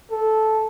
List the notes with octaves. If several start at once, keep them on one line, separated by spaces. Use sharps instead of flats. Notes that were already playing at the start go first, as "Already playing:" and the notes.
A4